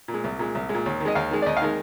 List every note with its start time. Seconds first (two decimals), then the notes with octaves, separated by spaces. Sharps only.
0.08 A#2
0.14 G#3
0.24 C2
0.39 A#2 G#3
0.55 C2
0.69 G#3
0.74 A#2
0.86 D#2
1.00 D#3
1.05 G#3 D#5
1.15 D#2 F5
1.31 D#3 G#3
1.42 D5
1.46 D#2 D#5
1.57 F5
1.62 D#3 G#3